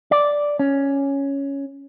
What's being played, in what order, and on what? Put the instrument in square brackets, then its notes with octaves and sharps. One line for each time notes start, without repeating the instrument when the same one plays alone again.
[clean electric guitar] D5
C#4